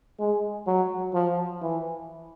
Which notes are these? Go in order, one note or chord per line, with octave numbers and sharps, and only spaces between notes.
G#3
F#3
F3
E3